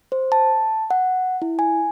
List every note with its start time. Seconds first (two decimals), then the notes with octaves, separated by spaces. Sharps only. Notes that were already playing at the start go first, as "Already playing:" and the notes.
0.12 C5
0.32 A5
0.91 F#5
1.42 E4
1.59 G#5